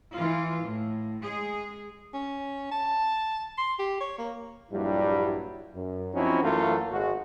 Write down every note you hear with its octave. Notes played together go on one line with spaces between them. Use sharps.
E3 F4
A2
G#3 G#4
C#4
A5
C6
G4
C#5
A#3
A#1 G2 F#3 G3 E4
F#2
F3 F#3 C4 C#4 D#4 E4
F#2 E3 F#3 A3 A#3 F4
G#1 G#3 F#4